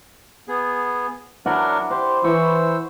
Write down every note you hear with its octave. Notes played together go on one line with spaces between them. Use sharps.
B3 G#4
F#3 D4 E4 A#4 D5 F#5
G4 C5
E3 C5 C#6 E6